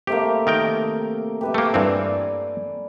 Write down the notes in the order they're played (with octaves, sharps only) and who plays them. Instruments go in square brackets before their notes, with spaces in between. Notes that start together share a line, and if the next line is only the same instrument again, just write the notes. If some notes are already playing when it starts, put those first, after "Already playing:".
[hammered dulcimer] C3 A3 A#3 [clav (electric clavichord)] G4
[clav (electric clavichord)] D#3 A#4 G5
[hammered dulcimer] G4 B4 E5
[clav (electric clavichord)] A3 A#3
[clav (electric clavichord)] G2 E3 C4 [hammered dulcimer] D5 G#5 D6